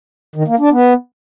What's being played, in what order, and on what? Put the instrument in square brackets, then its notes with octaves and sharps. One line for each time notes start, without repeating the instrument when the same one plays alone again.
[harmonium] D#3
A#3
D4
B3